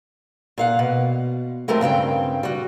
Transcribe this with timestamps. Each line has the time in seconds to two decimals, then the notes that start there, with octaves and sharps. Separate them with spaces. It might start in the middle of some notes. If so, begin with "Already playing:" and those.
0.58 A#2 F5 F#5
0.79 B2
1.68 F#3 G#3 A3 C4 G4 A#4
1.81 G2 C#3 C4 G5
2.43 G3 F#4